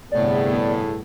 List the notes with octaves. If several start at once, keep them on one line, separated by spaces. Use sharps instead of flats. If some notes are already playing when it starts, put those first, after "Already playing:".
G1 A2 C3 B3 G#4 D5